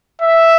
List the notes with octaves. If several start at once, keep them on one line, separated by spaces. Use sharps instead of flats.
E5